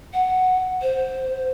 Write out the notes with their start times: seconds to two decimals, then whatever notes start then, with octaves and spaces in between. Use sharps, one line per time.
0.14 F#5
0.82 C5